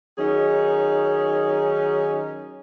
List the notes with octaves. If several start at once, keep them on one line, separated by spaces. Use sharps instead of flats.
D#3 F#3 C#4 D#4 G#4